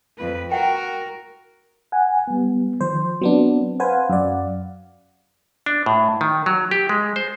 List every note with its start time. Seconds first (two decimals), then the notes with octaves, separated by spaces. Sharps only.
0.18 F2 B4
0.52 F#4 A#4 F#5 G5
1.92 F#5 G#5
2.27 G3 B3
2.81 D#3 F3 C5
3.21 F#3 B3 C4 D4
3.80 B4 C5 F5 F#5 G#5
4.09 F#2 D5
5.66 D4
5.86 A2
6.21 D#3
6.46 F#3
6.71 G4
6.89 G#3
7.16 C5